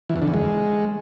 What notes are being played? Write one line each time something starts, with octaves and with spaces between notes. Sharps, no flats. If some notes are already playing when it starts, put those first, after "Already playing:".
E3
E2
D3
E2
G#3